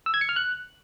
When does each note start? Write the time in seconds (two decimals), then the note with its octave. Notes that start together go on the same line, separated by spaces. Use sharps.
0.06 E6
0.14 G#6
0.21 C#7
0.29 F6
0.36 F#6